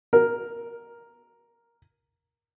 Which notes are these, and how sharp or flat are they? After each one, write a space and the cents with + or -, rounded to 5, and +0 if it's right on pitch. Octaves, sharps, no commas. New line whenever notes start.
A#4 +5